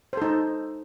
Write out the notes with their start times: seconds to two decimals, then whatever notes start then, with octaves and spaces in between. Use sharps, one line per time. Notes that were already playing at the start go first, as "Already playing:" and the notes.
0.13 C5
0.17 A4
0.22 D#4